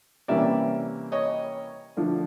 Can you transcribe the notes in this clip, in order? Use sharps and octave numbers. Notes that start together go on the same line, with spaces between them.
C3 E3 G3 A#3 C#4 D5 E5
C#5 D#5
D3 F3 A3 D4